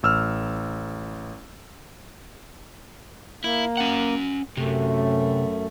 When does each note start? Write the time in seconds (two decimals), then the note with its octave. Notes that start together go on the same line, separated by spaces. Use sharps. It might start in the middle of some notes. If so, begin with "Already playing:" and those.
0.03 A1 E6 F6
3.44 A#3 E4
3.77 C#4 F#5
4.57 F#2 C3 A3